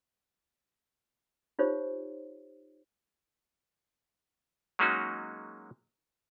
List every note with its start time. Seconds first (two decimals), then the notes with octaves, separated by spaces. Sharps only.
1.59 D#4 F4 G4 C5 C#5
4.79 F#3 G#3 A#3 C#4 D#4 F#4